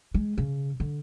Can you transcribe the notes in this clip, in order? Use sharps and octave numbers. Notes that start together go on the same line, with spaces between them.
G#3
C#3
D3